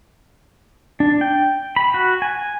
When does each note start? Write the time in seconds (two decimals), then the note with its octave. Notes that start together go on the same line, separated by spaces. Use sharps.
1.00 D4
1.21 G5
1.76 B5
1.94 F#4
2.22 G#5